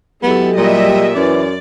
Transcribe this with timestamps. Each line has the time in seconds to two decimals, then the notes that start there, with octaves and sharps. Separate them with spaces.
0.23 F#3 G#3 B3 E4 G4 A4
0.57 A#2 G3 D#5 E5
1.15 F#2 E3 D5